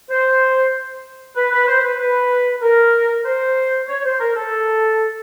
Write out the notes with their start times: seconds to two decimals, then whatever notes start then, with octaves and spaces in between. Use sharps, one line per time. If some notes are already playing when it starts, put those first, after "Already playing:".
0.10 C5
1.36 B4
1.52 B4
1.68 C5
1.83 B4
1.99 B4
2.62 A#4
3.25 C5
3.88 C#5
4.05 C5
4.20 A#4
4.36 A4